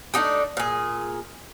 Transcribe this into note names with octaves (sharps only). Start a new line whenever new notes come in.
A3 D4 D#4 G4
A#2 G#4